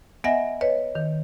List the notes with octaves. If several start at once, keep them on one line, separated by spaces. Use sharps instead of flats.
B3 D#5 E5 F#5 G#5 A#6
B4 C#5 D#5
D#3